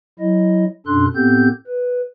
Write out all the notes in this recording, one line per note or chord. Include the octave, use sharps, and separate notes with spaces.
F#3 E4 D#5
F#2 B2 D4 A4 C6 F#6
A2 B3 C4 G4 A4 G6
B4